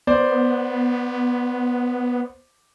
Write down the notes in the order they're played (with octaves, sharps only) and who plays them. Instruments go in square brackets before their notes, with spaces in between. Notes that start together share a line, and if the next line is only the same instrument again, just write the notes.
[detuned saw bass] B3 [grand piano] C5 D5